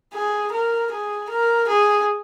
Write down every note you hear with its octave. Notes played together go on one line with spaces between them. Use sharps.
G#4
A#4
G#4
A#4
G#4